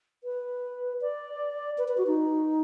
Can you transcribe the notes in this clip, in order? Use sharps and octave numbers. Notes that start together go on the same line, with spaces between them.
B4
D5
B4
B4
F#4
D#4